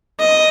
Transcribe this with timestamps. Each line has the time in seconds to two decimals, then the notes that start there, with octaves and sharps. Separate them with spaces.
0.20 D#5